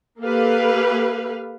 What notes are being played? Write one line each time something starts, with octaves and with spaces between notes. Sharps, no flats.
A#3 G4 A4 B4 F5